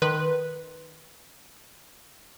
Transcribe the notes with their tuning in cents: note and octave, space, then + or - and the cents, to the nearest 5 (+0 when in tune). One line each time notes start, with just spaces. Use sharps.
D#3 +0 B4 +0 C6 +0